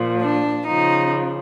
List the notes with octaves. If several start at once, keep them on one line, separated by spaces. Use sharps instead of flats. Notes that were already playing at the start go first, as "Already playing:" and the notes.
Already playing: A#2 F3
D4
C#3 F3 D#4